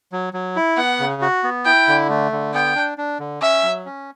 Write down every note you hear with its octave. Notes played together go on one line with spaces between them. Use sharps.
F#3
F#3
E4
B3 F#5
C#3
F#4
B3
E4 G5
D3
A3
D3
B3 G5
D4
D4
D3
C#4 E5
F#3
C#4